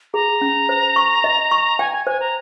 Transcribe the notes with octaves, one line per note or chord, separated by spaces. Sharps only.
G#4 A#5
C#4
C5
C#6
D#5
C#6
G5 G#5
G#5
C5 G#5
A#5